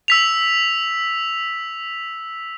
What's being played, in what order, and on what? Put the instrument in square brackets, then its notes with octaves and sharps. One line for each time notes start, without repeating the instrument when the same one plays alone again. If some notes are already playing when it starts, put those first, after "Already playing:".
[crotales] E6 B6 F7